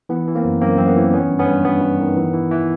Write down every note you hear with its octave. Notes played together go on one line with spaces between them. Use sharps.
E3 B3
E3
A#3 C4
F#2
F#2 A#3 C4
F#2 C4
B3
E3
D#3 B3 C#4
G2
B3 C#4
G2
G2 B3
G2
D#3
E3
E3
E3